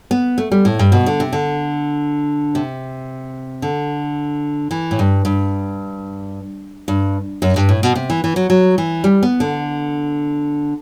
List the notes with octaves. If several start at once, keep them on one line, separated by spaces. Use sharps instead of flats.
B3
A3
G3
A2
G2
B2
D3
C3
D3
C3
D3
E3
A2
G2
G2
G2
F#2
G2
A2
B2
C3
E3
E3
F#3
F#3
E3
G3
B3
D3